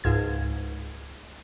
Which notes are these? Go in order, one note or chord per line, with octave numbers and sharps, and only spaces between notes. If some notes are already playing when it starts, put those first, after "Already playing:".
C#2 G#2 G#6